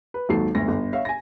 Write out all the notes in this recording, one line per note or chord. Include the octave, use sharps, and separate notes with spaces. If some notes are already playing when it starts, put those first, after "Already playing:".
B4
G#1 D#2 F#3 A4 C7
G1 D2 A#6
G1
C#5 E5 F5
G#5 A#6